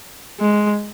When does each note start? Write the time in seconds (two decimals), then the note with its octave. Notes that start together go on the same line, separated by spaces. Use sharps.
0.40 G#3